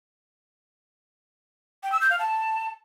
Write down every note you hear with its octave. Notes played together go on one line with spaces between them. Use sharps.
G5
E6
G6
F5
A5